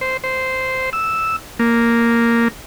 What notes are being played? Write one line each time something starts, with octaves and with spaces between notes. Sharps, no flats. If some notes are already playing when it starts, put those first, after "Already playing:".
C5
C5
E6
A#3